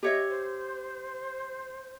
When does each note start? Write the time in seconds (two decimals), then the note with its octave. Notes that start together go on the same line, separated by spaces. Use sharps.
0.03 G4 C#5 D#5 E5
0.30 C5